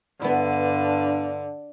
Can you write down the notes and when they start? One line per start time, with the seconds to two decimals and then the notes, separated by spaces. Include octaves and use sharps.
0.22 G2 D3 B3 E4